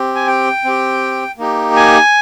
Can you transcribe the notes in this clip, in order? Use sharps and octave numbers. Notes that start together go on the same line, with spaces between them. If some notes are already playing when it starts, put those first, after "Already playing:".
Already playing: C4 G4
G#5
G5
C4 G4
A#3 D#4 G4
G#5